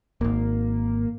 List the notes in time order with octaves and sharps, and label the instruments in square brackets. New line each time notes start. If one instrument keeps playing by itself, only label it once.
[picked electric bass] D#1 G#1 [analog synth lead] A#3